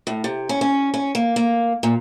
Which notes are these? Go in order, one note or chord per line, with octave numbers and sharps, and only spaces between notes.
A2
C3
C#4
C#4
C#4
A#3
A#3
A#2